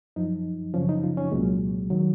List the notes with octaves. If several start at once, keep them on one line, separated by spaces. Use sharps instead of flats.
F#2 F3 D#4
F#2 C#3 F3 C#4
D#4
F4
C#4
C2 A#2 F#3 G#3
D#3 F#3